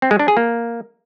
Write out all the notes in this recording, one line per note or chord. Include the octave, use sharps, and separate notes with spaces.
C4
G#3
D4
G#4
A#3